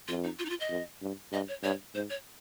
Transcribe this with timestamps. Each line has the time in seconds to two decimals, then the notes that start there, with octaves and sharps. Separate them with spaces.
0.08 F2 F4
0.24 D#4
0.39 F4
0.45 D#4
0.50 F4
0.60 D#5
0.70 F2
1.02 G2
1.32 G2 D#5
1.48 C#5
1.63 G2 C#5
1.95 G#2 C5
2.10 C#5